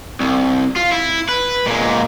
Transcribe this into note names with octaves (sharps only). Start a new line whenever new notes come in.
C2
F4
E4
B4
A#2 G#3